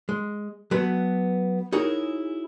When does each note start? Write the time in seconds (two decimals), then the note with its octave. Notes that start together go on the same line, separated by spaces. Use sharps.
0.09 G#3
0.71 F#3 A3 B3 B4
1.72 D#4 E4 F#4 G#4 A#4 C#5